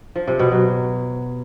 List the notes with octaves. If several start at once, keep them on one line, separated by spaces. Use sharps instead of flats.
F3
C3
B2
F#3